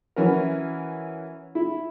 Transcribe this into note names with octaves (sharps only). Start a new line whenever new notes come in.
E3 C#4 F#4 A#4
E4